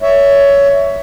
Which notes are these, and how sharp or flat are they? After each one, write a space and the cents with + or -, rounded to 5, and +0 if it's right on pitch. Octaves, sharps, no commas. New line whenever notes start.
C#5 +15 E5 +0